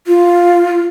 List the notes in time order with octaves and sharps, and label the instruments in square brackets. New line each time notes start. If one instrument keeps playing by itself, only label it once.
[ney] F4